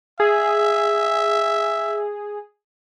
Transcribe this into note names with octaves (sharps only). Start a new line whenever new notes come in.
G#4 E5